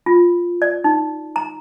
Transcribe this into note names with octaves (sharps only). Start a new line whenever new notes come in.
F4
D5
D#4
A#5